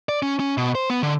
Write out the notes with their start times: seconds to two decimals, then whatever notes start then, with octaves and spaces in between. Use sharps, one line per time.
0.09 D5
0.22 C#4
0.40 C#4
0.58 B2
0.75 C5
0.90 B3
1.03 D3